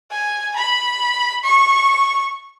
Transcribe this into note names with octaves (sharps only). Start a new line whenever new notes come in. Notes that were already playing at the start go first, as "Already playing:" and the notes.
G#5
B5
C#6